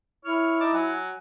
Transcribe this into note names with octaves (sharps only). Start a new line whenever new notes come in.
E4 C#5 F6
D#4 A5 D6
F#3 F#5 G#5